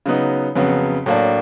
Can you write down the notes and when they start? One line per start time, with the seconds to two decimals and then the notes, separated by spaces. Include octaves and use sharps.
0.06 C#3 F#3 B3 D#4
0.56 F2 C#3 F#3 B3
1.06 A2 F#3 A#3 D4